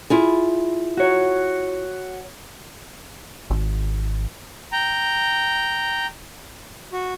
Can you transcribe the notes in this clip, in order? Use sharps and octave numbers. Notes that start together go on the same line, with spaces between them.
E4 F4 G#4
F#4 C#5
G#1
G5 A#5
F#4